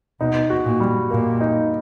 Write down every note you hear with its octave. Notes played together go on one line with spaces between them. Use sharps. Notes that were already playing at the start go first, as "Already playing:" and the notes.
B2 D#4
F#4
A#2
G3
A#2 A#3
D#4